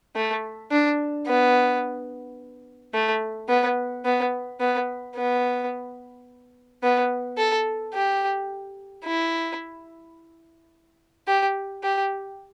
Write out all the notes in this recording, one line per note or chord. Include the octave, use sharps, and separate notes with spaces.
A3
D4
B3
A3
B3
B3
B3
B3
B3
A4
G4
E4
G4
G4